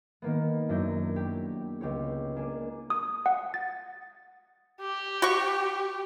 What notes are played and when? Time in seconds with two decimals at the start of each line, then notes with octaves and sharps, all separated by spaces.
0.22 D#3 A#3 B3
0.69 F#2 D4 E4 G6
1.16 G4
1.81 C#2 G4 C#5
2.36 A#3 D4 G#5
2.90 D#6
3.26 F#5
3.54 A6
4.81 G4
5.22 F#4 C#6